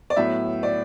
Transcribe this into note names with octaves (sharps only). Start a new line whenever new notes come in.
D5
A2 F#3 B3 E5
D5